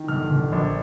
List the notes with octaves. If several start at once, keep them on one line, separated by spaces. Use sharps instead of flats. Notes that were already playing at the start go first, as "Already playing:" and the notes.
Already playing: D#3
G1 F6
G1
A#1